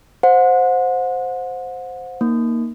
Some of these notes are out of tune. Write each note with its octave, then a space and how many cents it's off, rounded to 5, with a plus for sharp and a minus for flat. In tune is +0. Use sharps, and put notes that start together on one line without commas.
C5 +0 F#5 -35
A#3 +0 D#4 +0